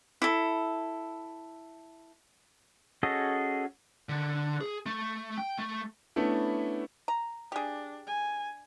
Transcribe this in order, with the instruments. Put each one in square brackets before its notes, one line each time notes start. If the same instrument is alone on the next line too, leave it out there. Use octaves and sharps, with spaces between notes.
[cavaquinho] E4 A4
[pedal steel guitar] C#4 F#4 G#4 A4 D#5
[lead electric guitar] D3
G#4
A3
G5
A3
[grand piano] A3 B3 C#4 D4 E4
[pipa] A#5
[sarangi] D4 [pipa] G4 G#4
[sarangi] G#5